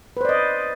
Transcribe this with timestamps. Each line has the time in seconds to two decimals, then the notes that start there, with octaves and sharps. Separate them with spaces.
0.17 B4
0.21 C5
0.25 D5
0.29 D#5